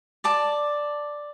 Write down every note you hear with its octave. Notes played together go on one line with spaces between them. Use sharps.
D5 A5 D6